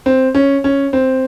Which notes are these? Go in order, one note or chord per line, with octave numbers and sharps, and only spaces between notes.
C4
C#4
C#4
C4